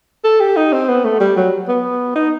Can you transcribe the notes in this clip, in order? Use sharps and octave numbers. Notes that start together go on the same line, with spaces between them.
A4
G4
D#4
C4
B3
A3
G3
F#3
B3
D#4